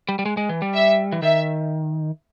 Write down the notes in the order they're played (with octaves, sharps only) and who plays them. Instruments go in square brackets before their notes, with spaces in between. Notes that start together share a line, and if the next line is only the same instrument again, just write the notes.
[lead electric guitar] G3
G3
G#3
G#3
E3
G3
[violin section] E5
[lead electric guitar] E3
[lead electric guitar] D#3 [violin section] E5